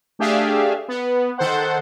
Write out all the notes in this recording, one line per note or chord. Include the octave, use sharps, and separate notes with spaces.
A3 D4 G4 G#4 E5 F5
B3
D#3 A4 C5 F#5